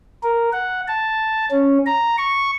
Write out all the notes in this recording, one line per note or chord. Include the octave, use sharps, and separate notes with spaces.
A#4
F#5
A5
C#4
A#5
C#6